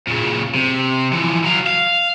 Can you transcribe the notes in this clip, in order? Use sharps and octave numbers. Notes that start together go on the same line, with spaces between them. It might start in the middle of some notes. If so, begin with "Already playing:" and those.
A#2 C#3
C3
E3 F3
F#3 F5
F5